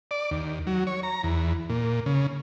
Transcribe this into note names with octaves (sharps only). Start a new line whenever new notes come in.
D5
D#2
F#3
C#5
A#5
E2
A#2
C#3